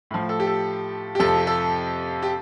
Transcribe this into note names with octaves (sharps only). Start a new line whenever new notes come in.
A2 F3
A4
G4
A4
G4
F2 C3 F3 A4
G4
A4
G4